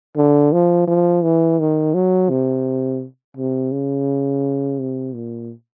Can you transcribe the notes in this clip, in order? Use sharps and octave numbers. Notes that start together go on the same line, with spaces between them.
D3
F3
F3
E3
D#3
F#3
C3
C3
C#3
C3
A#2